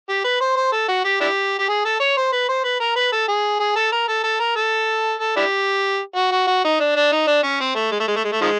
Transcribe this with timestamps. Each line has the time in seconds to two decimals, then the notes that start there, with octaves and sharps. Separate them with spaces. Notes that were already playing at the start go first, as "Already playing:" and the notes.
0.09 G4
0.24 B4
0.41 C5
0.56 C5
0.72 A4
0.88 F#4
1.04 G4
1.21 D4 E4 G4
1.59 G4
1.68 G#4
1.85 A4
2.00 C#5
2.17 C5
2.32 B4
2.49 C5
2.64 B4
2.80 A#4
2.96 B4
3.12 A4
3.28 G#4
3.60 G#4
3.76 A4
3.92 A#4
4.08 A4
4.24 A4
4.40 A#4
4.56 A4
5.19 A4
5.36 D4 E4 G4
6.16 F#4
6.32 F#4
6.47 F#4
6.64 D#4
6.80 D4
6.96 D4
7.12 D#4
7.27 D4
7.43 C#4
7.60 C4
7.75 A3
7.91 G#3
8.00 A3
8.08 G#3
8.16 A3
8.24 G#3
8.33 A3
8.41 D#3 F3 G#3